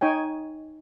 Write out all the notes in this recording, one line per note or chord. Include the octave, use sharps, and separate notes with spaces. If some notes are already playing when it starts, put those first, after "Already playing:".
D#4 C#5 G5 G#5